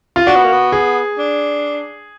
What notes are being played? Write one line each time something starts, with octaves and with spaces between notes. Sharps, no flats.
F4
D4 F#4
B3
A#3
B3
G#4
D4